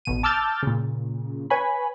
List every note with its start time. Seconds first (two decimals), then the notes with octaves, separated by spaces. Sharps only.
0.05 A1 B2 D#7
0.23 A5 D6 E6 F6 G6 A6
0.63 A#2 C#3
1.50 B4 C#5 G#5 B5